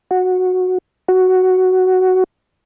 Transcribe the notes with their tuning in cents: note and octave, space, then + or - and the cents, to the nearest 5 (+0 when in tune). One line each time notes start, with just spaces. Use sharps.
F#4 -10
F#4 +5